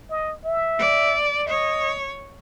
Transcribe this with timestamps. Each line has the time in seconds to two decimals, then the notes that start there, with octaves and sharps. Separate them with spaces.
0.10 D#5
0.45 E5
0.79 D5
1.47 C#5 D#5